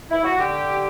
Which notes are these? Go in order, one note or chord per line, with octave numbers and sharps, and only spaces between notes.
E4
F#4
D3 G4